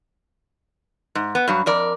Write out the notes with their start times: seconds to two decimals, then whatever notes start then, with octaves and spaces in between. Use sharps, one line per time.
1.15 G#2
1.35 B3
1.48 G2 F#3
1.66 F2 A#4 D5